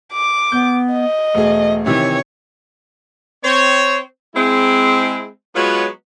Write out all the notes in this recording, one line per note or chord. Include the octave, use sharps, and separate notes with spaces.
D6
B3 G6
D#5
E1 A3 G#4
C3 D#3 E3 C#5
C4 C5 C#5
G#3 C4 E4
F#3 G#3 B3 F4 B4 C#5